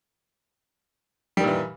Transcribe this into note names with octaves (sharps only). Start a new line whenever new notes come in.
A#2 D#3 E3 G3